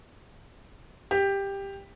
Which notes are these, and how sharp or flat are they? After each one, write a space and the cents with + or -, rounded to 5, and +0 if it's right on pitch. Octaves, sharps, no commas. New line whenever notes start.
G4 +10